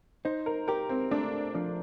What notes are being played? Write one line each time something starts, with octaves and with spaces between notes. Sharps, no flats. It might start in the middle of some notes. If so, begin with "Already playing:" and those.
D#4 C5
A#4
G4 A#4
C4
A3 D4
F3 D4